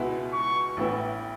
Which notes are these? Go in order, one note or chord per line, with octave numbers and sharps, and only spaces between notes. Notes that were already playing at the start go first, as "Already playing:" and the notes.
Already playing: C#2 B2 G#3 B3 E4
C#6
A1 A2 E3 B3 E4